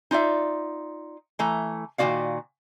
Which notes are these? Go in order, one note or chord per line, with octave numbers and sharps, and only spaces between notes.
D#4 F4 D5 E5
E3 A3 A#5
A#2 D#3 G#3 F#4 D5 F5